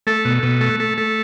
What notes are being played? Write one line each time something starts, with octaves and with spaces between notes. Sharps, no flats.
A3 A4
B2
B2
A3
A3
A3